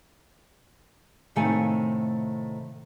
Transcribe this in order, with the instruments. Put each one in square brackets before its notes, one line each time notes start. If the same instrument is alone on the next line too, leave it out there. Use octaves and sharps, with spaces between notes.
[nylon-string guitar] A2 C3 D#3 A3 F5 G#5